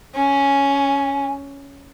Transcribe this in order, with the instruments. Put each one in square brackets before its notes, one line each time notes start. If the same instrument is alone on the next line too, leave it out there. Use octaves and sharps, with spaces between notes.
[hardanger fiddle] C#4 [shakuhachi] G#5